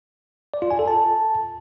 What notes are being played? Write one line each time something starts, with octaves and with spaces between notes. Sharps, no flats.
D5
F4
G#5
A4
A5